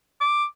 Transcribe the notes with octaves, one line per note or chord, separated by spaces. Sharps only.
D6